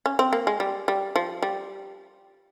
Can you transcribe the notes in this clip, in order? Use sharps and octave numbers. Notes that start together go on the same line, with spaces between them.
C#4
C4
A#3
G#3
G3
G3
F3
G3